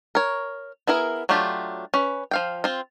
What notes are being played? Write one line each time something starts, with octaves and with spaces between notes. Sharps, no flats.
A#4 C#5
B3 E4 G#4 A#4
F#3 A3 D4 F4 G4
C#4 B4
F3 F5 G5
C4 F4